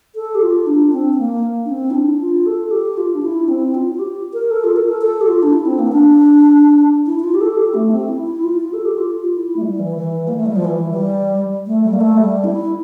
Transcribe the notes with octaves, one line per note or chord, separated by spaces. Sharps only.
A4
G4
F4
D4
C4
C4
A#3
D4
C4
E4
D4
F4
A4
G4
F4
D4
E4
C4
F4
F4
G4
A#4
A4
F4
A#4
A4
A4
G4
F4
D4
E4
C4
A#3
C4
D4
E4
E4
F4
G4
A4
G4
A3
C4
E4
E4
F4
F4
A4
G4
F4
F4
E4
A3
G3
E3
E3
A#3
A3
G3
F3
E3
G3
A3
G3
A#3
A3
G3
E4